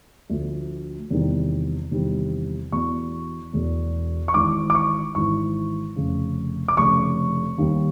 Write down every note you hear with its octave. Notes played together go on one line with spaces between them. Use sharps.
D2 D3 F3
E2 C3 D#3 G3
E2 C3 D#3 G3
E1 E2 B2 C#6
E1 E2 B2
C#6
G#1 G#2 E3 D6
D6
C#6
G#1 G#2 E3 C#6
F1 F2 C#3
D6
F1 F2 C#3 C#6
D#2 D#3 G3